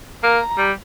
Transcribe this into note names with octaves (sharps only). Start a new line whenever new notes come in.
A#3 A#5
G3